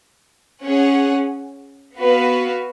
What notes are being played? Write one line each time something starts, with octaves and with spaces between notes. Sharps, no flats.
C#4 G#4 C#5 F#5
B3 F#4 B4 F5